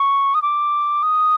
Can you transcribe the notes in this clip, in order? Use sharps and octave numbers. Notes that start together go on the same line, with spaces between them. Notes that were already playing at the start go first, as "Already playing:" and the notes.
Already playing: C#6
D#6
D6
D#6